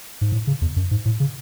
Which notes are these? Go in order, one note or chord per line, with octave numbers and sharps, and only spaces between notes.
G#2
A2
C#3
E2
F#2
G#2
A2
C#3